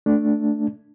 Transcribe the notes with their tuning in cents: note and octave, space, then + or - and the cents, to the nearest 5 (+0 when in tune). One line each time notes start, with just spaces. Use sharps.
A3 +0 D4 +0